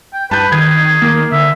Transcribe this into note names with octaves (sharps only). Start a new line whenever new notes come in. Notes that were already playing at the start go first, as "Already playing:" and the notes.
G5
G2 B4 A5 G6
D#3 G#4 G#6
D#3 A#3
D3 E5